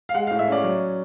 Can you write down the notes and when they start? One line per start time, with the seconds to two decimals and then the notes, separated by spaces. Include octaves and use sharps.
0.09 F5
0.14 G#3 F#5
0.27 F5
0.31 A2
0.39 E5
0.48 C#4 D5
0.64 F#3